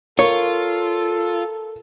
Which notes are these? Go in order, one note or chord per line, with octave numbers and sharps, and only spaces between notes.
F4 A4 A#4 C#5